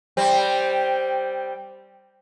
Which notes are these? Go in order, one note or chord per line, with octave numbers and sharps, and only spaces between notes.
G3 C4